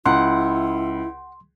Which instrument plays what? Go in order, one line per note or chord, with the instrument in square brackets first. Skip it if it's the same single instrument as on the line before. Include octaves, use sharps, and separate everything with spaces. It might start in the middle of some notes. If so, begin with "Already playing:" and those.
[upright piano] C#2 [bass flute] E4 [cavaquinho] F#5 [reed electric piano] C6